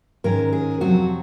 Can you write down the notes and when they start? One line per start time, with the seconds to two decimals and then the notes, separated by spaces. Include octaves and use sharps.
0.24 G#2 D#3 G#3 C#4 A#4
0.53 G#4
0.80 F2 C3 F#3 C4 F#4